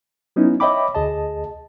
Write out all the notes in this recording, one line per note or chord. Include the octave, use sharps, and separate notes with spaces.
F#3 B3 C#4 D#4 E4
C#5 D#5 E5 G5 B5 D6
D2 G#4 D#5 A5